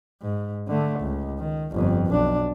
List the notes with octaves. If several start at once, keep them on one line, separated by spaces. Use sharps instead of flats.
G#2
D3 A3
C#2
D#3
G1 F2
B1 D4